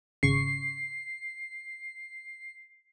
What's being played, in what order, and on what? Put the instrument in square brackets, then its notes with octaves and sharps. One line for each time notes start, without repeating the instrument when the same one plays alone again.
[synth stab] G#1 C#3 C#6 [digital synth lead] C7